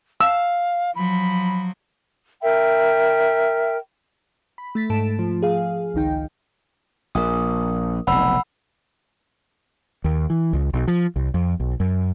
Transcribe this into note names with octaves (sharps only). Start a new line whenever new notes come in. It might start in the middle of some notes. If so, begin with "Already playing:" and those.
F5 E6
F3 F#3 B5
A#4 E5 G5
B5
A3 A6 B6
G#2 A3 A4 A5 D7 E7
F3
G#4 F5
G#1 C#2 D#3 D#4 G5
A#1 A#4 D#6
F1 B1 F#5 B5 E6
D#2
E3
C#2
B1
F3
C2
F2
B1
F#2